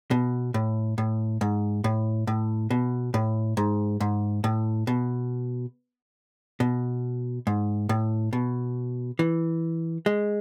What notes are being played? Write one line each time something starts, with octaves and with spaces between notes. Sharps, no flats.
B2
A2
A2
G#2
A2
A2
B2
A2
G#2
G#2
A2
B2
B2
G#2
A2
B2
E3
G#3